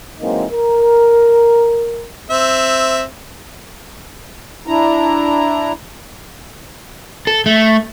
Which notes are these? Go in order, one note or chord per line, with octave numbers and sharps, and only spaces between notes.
E3 F#3 G#3 A#3 C4 D#4
A#4
C4 E5
D4 E4 A#5
A4
A3